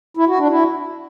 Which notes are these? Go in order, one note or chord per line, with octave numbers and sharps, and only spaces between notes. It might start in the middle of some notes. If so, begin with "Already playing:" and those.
E4
F#4
D4
E4